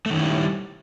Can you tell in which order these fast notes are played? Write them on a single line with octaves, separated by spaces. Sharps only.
A3 D#3 C#4 E4 G3